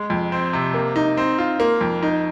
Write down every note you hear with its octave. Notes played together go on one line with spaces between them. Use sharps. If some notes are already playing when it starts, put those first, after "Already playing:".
Already playing: G#3
F2
C4
C3
A#3
D#4
C4
F4
A#3
F2
D#4